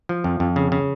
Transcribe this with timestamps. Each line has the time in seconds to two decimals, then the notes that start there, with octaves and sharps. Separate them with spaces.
0.09 F3
0.24 F2
0.40 F2
0.56 C#3
0.72 C#3